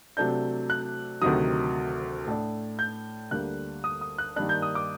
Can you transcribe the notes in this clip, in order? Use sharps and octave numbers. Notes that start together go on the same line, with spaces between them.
C3 F#3 A3 D4 G6
F#6
D2 C3 D#3 F#3 D#6
A2 A3 D4
G6
D2 D3 G3 A#3 D4 F#6
D#6
D#6
F#6
G2 D#3 G3 A#3 D4 F#6
G6
D#6
D6